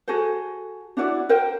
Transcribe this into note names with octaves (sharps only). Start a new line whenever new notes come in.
F#4 G#4 A4 C5
D4 E4 F#4 D5
A#4 C5 G5